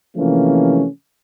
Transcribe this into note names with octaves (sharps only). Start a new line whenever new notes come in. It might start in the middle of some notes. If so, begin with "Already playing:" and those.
C3 E3 F3 A3 A#3 C#4